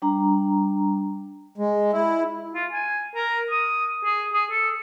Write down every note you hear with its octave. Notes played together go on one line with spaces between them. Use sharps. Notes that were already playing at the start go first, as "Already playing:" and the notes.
G3 D4 A#5
G#3
E4
F4
G#5
A#4
D#6
G#4
G#4
A4